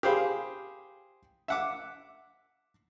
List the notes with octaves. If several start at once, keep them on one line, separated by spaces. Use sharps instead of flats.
G4 G#4 C5 F5 B5
E5 F#5 D6